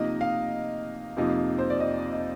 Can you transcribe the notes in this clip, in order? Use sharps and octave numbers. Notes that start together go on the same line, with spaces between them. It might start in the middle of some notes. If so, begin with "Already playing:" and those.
Already playing: C3 F3 A#3 D#4 D#5
F5
F2 C3 F3 A#3 D#4
C5
D5
D#5
D#5